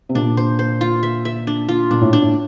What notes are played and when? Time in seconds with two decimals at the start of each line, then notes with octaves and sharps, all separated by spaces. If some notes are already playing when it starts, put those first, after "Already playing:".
0.09 C3
0.15 A#2 D4
0.37 C5
0.59 C5
0.81 F4
1.03 E5
1.25 E5
1.47 D4
1.69 F4
1.90 A#2 D4
2.01 A2
2.13 D4
2.22 A2